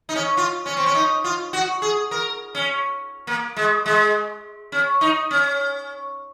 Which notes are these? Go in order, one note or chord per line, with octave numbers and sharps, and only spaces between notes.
D#4
C#4
F4
C#4
C4
C#4
D#4
F4
F#4
G#4
A#4
C#4
A#3
G#3
G#3
C#4
D#4
C#4